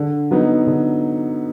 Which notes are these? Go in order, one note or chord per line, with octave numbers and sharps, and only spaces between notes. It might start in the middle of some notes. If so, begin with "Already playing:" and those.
Already playing: D3
F#3 B3 D#4
D3